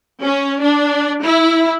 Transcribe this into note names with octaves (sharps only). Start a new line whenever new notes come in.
C#4
D4
E4